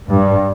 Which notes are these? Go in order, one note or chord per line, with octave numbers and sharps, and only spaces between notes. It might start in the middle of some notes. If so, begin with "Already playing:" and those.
G2